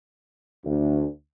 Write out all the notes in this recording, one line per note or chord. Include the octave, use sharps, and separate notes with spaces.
D2